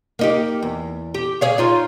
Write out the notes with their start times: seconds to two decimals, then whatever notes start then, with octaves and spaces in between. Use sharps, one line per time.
0.19 A#3 D#4 G4
0.62 E2
1.14 G4
1.41 G#4 C#5 F5
1.58 D#4 F4 C#5